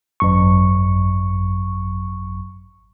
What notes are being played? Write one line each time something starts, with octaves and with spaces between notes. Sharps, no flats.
G#1 F#2 C#6